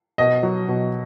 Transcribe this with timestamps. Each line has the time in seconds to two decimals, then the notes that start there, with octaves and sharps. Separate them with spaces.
0.18 B2 D#5
0.43 F#3
0.68 B2